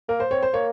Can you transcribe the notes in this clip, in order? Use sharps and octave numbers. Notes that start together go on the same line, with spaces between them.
A#3 A#4
C5
C4 C#5
C5
A#3 C#5